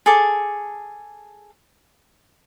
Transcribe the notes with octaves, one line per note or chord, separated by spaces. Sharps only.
G#4 A4 D6